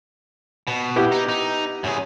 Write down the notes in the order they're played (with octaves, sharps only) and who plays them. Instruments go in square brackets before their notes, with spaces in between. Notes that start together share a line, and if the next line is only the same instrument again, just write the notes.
[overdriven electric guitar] B2
[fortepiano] B3 E4 G4
[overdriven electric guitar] D#4
D#4
F#2 G#4